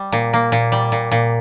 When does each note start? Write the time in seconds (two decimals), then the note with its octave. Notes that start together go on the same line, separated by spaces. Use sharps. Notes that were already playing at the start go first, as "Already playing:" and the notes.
Already playing: G3
0.12 A#2
0.33 A#3
0.52 A#2
0.72 G3
0.92 A#2
1.12 A#2